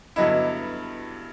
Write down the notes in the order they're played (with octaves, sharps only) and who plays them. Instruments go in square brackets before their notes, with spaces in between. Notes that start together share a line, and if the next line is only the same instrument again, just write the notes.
[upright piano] G2 D3 F#3 B3 E4 [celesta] D#5